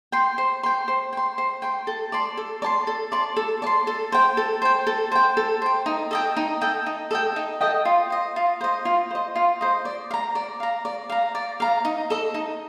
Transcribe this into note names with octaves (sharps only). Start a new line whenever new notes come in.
G5 C6
C5
G5 C6
C5
G5 C6
C5
G5 C6
A4
D5 A5 C6
A4
D5 A5 C6
A4
D5 A5 C6
A4
D5 A5 C6
A4
C5 G5
A4
C5 G5
A4
C5 G5
A4
C5 G5
D#4
A4 D#5 G5
D#4
A4 D#5 G5
D#4
A4 D#5 G5
D#4
A4 D#5 G5
F4
C5 D#5
F4
C5 D#5
F4
C5 D#5
F4
C5 D#5
D5
F5
A#5
D5
F5 A#5
D5
F5 A#5
D5
F5 A#5
D#4
A4 D#5
D#4